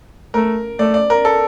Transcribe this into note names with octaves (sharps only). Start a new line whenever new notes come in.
A3 A#4
A3 D5
D5
A#4
A4